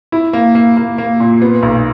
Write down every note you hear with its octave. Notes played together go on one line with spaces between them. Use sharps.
E4
A#3
A#3
A#3
A#3
A#2
B3
B1